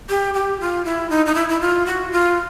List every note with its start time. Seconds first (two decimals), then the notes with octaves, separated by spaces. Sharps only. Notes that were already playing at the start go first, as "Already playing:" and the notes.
0.10 G4
0.34 G4
0.60 F4
0.85 E4
1.10 D#4
1.26 D#4
1.35 E4
1.49 E4
1.61 F4
1.86 F#4
2.12 F4